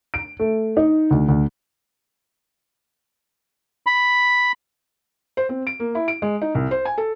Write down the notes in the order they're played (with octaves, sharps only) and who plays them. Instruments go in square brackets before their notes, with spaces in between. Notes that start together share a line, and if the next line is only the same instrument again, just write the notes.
[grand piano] D7
A3
D#4
D2
D2
[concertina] B5
[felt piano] C5
C4
D7
A#3
E4
D7
G#3
D#4
C2
C5
G#5
A4